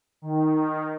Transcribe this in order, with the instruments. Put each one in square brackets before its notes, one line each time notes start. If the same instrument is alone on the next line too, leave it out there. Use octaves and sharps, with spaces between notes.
[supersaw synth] D#3